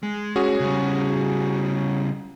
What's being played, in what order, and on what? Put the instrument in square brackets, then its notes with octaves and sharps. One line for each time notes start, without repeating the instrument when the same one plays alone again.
[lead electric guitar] G#3
[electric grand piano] C#4 F#4 G#4
[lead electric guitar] C#3 G3